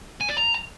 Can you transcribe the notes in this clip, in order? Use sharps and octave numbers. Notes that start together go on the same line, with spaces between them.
G#5
D5
A#5